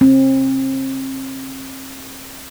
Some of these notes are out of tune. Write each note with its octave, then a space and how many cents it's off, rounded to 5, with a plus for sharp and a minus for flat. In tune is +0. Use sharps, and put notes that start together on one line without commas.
C4 +35